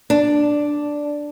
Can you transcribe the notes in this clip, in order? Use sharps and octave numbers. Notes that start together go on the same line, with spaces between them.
D4